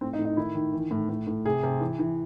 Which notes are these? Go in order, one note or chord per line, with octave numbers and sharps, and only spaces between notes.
A2 C4
D#4
A2
D#4
D#3 E4
D#3
E3
A2
A2
A2
C3 G#4
C3
E3
E3